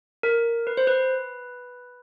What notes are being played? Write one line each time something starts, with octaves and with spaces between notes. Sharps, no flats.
A#4
B4
C5
B4